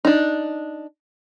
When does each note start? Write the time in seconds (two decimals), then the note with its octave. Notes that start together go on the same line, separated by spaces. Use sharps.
0.05 D4 D#4